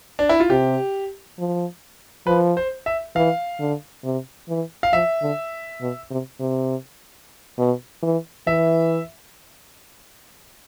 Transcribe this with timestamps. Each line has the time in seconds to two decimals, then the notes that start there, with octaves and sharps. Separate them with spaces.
0.19 D4
0.29 E4
0.40 F4
0.50 C3 G4
1.39 F3
2.27 F3 B4
2.57 C5
2.86 E5
3.15 E3 F5
3.60 D3
4.04 C3
4.48 E3
4.83 F5
4.93 F3 E5
5.22 D3
5.81 B2
6.11 C3
6.40 C3
7.58 B2
8.02 E3
8.47 E3 E5